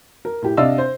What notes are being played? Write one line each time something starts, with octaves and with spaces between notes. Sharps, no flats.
A#4
A2 G4
C3 D4 D5 D#5 F5 E6
C5